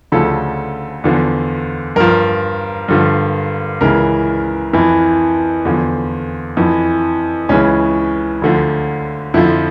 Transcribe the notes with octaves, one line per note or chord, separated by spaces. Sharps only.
D2 C#3 F3 A4
E2 D3 F3
G2 F3 A#4
G2 D3 F3
C#2 C#3 E3 A#4
F2 E3
E2 D3 F3
F2 E3
C#2 C#3 E3 C#4
D2 D3 F3
F2 D3 F3 E4